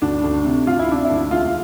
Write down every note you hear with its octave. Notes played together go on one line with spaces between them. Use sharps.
D2 D4
D2
C3
D2 F4
E4
C3 D4
E4
D2
E1 F4